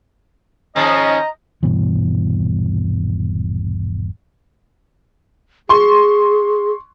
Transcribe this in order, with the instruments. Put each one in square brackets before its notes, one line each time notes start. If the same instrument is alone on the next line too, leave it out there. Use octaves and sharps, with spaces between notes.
[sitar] G#2 D#3 F3 [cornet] C#4 [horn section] D#5 [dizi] A#5
[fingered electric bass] D#1 G2 B2 E3
[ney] G#4 [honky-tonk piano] C6 C#6